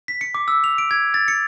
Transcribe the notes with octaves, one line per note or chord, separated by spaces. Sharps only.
B6
C#7
D6
E6
F7
D7
G#6
A6
C#7